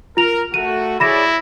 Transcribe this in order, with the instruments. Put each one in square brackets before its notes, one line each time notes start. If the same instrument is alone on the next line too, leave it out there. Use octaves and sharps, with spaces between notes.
[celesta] F4 F7 [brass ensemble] A#4
[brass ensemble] A3 F#4 [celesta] D#7
[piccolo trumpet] E4 [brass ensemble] G#4 C#5 D5 [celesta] B5 A#6 E7